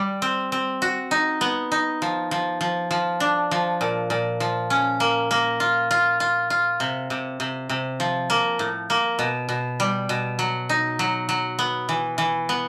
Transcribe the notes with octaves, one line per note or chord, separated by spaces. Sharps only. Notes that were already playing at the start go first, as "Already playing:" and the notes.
Already playing: G3
C4
C4
F#4
D#4
B3
D#4
F3
F3
F3
F3
D4
F3
A#2
A#2
F3
C#4
A#3
A#3
F4
F4
F4
F4
C3
C3
C3
C3
F3
A#3
A2
A#3
B2
B2
G3
B2
F#3
D#4
F#3
F#3
B3
E3
E3
B3